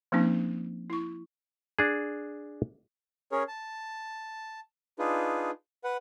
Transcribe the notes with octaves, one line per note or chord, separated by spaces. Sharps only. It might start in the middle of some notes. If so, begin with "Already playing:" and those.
F3 A#3 C4 C#4 D#4
E4 C#6
D4 G#4
C#4 G#4 A#4 C#5
A5
D4 D#4 F4 G#4 B4
B4 F#5